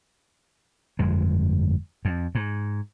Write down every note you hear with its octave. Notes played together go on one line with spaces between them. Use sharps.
G1 F2 G#3
F2
G#2